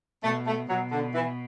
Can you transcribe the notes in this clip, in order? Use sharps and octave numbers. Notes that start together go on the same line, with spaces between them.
B2 A3
A3
B2 F#3
D3
E3